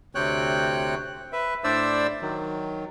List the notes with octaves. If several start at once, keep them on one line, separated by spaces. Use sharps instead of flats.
D2 C3 C4 C#5 G5 F#6
B4 E5
A2 D4 C5 D5 E5 E6
D#3 F#3